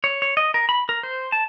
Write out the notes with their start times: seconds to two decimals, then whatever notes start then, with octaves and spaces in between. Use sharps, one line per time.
0.04 C#5
0.22 C#5
0.37 D#5
0.54 A#4
0.69 B5
0.89 A#4
1.03 C5
1.32 A5